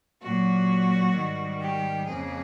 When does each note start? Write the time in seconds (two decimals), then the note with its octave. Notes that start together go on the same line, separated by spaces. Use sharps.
0.22 A#2 F#3 A#3 F#4
1.15 G#2 D#3 G3
1.61 G4
2.06 F2 C#3 F3 A#3 G#4